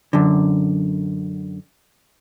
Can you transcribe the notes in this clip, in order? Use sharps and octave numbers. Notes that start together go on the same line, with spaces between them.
F#2 D3